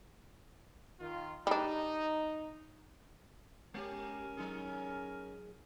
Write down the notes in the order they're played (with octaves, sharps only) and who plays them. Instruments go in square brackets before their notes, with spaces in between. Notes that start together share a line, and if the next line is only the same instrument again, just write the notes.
[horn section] D#3 F4
[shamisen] G3 D4 [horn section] D#4
[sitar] G#3 G4 [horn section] C#4 A#4
[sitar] F#3 D#4 G#4